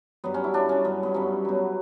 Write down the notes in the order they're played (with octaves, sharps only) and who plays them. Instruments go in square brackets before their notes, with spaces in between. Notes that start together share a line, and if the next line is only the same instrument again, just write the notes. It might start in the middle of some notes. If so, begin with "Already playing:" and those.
[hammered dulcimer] G2 F#3 B3
C#4
E4
G2 F#3 D4
C#4
G2 F#3 B3
B3
G2 F#3 C#4
B2 F#3